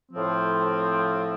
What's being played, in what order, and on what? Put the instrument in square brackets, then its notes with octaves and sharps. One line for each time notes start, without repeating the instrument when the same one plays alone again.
[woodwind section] A2 F3 C4